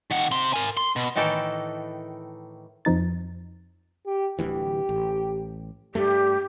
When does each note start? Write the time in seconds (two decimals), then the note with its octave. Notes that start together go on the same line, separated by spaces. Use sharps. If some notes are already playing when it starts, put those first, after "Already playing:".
0.11 D#3 F#5
0.31 C3 C6
0.53 A#4 G#5
0.77 C6
0.96 B2
1.16 A2 D#3 E3 A4 G5
2.85 F2 F3 D#4 A6
4.06 G4
4.39 D1 D2 E3 G4
4.89 A1
5.95 G2 G3 A3 G4